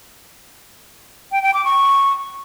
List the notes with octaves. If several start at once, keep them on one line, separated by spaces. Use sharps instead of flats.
G5
G5
D6
C#6